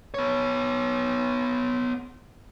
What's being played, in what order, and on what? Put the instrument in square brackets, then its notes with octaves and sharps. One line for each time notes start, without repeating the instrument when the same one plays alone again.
[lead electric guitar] B3 C#5